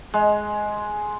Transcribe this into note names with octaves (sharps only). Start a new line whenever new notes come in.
G#3